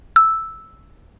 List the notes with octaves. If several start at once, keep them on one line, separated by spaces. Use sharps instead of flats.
E6